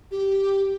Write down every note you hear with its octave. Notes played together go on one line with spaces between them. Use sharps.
G4